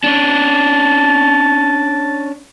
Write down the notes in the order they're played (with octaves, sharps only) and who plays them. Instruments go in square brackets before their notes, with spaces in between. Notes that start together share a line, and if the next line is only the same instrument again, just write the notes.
[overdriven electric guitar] C#4 D4 [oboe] A5